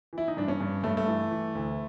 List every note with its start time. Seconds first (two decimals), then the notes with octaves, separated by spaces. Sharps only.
0.13 E3 E4
0.28 D#4
0.37 G2 D4
0.48 C#4
0.61 G2
0.83 G2 A3
0.97 A3
1.08 E3
1.31 E3
1.55 D2